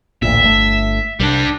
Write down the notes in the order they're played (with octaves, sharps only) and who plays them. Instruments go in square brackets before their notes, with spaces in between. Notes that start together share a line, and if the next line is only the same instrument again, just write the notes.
[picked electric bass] A1 D2 A#2 [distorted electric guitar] E5
[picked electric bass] G1 A3
[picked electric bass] C2 [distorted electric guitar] G3 D4